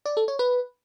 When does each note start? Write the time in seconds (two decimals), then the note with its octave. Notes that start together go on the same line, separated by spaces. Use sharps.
0.05 D5
0.17 A4
0.28 C#5
0.39 B4